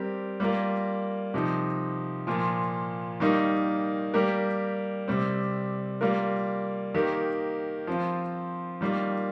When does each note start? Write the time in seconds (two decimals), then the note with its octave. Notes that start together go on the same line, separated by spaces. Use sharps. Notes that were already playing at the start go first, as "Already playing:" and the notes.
Already playing: G3 C4 G4 A#4
0.40 G3 A#3 F4 A#4
1.34 C3 F3 D#4
2.27 A#2 F3 A#3 F4
3.20 D#3 G3 A#3 D#4
4.14 G3 A#3 G4 A#4
5.08 C3 G3 C4
6.01 G3 A#3 F4 A#4
6.94 D#3 A#3 G4 A#4
7.87 F3 C4 F4
8.81 D#3 G3 A#3 F4